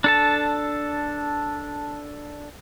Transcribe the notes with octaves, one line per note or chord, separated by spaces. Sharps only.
D4 A4 A5